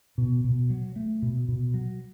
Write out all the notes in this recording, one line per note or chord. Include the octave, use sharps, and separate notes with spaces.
B2
B2
F#3
A3
B2
B2
F#3